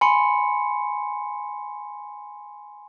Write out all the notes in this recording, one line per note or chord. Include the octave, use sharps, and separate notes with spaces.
G#5 B5 C6 C#7